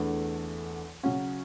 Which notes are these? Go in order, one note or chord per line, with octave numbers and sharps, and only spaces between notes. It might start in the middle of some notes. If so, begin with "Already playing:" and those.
Already playing: E2 D3 A3
C#3 F#3 C#4 F#4